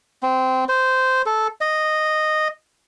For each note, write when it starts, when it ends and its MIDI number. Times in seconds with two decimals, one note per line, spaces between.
0.23 0.65 60
0.69 1.22 72
1.26 1.47 69
1.61 2.48 75